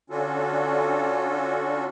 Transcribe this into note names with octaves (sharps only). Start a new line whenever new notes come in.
D3 C#4 D4 F4 F#4 A4